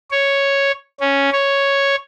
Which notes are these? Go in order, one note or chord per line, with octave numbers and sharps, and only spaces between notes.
C#5
C#4
C#5